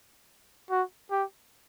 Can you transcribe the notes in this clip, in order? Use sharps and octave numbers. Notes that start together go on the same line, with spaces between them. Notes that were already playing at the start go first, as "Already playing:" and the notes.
F#4
G4